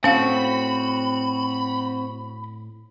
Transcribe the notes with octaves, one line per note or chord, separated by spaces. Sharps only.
A2 C4 C#4 F#4 F5 B5